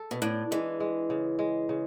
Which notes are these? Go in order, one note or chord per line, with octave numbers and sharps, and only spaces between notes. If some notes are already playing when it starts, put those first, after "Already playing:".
Already playing: A4
B2
A2 D4
E3 G#3
G#3
C#3
G#3
C#3